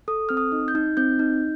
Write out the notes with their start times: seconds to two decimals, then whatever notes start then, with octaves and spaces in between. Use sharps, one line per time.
0.08 A4 D#6
0.29 C4 F6
0.37 D#6
0.52 D#4
0.68 G6
0.75 D#4
0.97 C4 G6
1.19 D#4